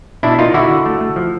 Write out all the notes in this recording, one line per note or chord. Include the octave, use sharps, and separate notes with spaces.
B2 D4 E4
A#3 D#4 F4
D3 E4 F#4
D3
A3
A3
F3